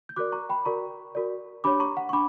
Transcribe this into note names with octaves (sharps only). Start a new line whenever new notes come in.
G6
F#4 A#4 D5 D6 F#6
A#5 C#6
G5 B5
F#4 A#4 D5 A#5 C#6
F#4 A#4 D5
D4 G4 C#5 B5 D6
A#5 C#6
F#5
C#6
D4 B5 D6